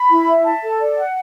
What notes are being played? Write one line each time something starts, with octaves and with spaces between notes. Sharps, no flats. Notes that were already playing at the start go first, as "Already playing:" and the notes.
Already playing: B5
E4
E5
A5
A4
D5
F#5